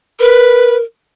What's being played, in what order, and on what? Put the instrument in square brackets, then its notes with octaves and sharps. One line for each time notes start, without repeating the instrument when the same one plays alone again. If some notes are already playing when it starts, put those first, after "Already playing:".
[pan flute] A#4 [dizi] B4